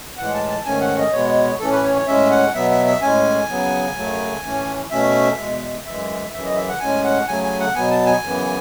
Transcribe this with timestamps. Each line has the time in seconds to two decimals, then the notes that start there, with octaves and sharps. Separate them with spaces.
0.18 A2 E3 G#3 F#5
0.34 A5
0.49 A5
0.65 G#2 D#3 A3 C#4 G#5
0.81 F#5
0.97 D#5
1.12 B2 G#3 B3 C#5
1.60 A2 E3 A3 C#4 A4
1.72 B4
1.84 C#5
1.96 C#5
2.07 A2 G#3 C#4 E5
2.31 F#5
2.54 B2 F#3 B3 E5
2.71 E5
2.86 E5
3.02 A2 G#3 C#4 G#5
3.49 C#3 F#3 B3
3.96 F#2 C#3 F#3 A3
4.44 A2 E3 A3 C#4
4.91 B2 A3 C#4 E5
5.38 E2 B2 G#3
5.86 F#2 E3 G#3 E5
6.33 F#2 C#3 E3 E5
6.45 D#5
6.56 E5
6.69 F#5
6.80 A2 G#3 C#4 G#5
7.04 F#5
7.27 C#3 F#3 A3 G#5
7.43 G#5
7.60 F#5
7.75 B2 F#3 B3 G#5
7.91 A5
8.06 G#5
8.22 F#2 C#3 E3 B3